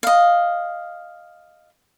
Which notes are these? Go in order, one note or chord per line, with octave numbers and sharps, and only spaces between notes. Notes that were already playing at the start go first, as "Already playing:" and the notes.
D#5 F5